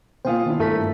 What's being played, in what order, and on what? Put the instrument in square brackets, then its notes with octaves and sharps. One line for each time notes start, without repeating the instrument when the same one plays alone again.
[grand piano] B2 F4 F5 [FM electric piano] A#3 C5 [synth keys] G5 G#5 D#6
[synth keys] D#3 D4 E4
[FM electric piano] G2 A#4 B6 [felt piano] A3